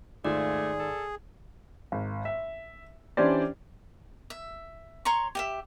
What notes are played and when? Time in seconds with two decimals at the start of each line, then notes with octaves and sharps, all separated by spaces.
0.25 D#2 G#2 A3 F4 G#4 D5
0.79 A4
1.92 G#1
2.25 E5
3.17 E3 C#4 D4 G4 C5 D5
4.30 E5
5.05 C#5 A#5 C6 C#6
5.35 G4 D#5 E5